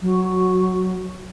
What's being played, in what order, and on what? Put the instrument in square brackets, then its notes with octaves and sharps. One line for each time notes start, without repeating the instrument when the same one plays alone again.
[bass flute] F#3